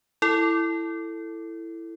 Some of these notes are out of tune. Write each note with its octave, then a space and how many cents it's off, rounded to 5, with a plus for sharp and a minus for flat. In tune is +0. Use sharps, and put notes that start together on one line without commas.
E4 +10 A4 +15